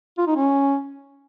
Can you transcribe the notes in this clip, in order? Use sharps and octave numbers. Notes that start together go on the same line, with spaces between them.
F4
D#4
C#4